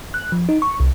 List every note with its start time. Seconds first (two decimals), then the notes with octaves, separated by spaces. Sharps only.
0.14 F#6
0.32 F3
0.49 D#4
0.62 C#6
0.80 C2